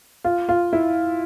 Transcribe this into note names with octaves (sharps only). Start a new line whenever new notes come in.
F4
F4
E4